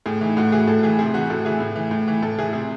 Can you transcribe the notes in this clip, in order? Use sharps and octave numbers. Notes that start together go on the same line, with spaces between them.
A2 G#4
E3 D#4
A2 F#4
E3 G#4
A2 A4
E3 G#4
C3 G#4
E3 F#4
A2 A4
E3 G#4
A2
E3
A2
E3
A2 A4
E3 G#4
C3 G#4